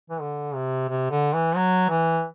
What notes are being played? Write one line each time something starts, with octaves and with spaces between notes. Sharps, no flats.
E3
D3
C3
C3
D3
E3
F#3
E3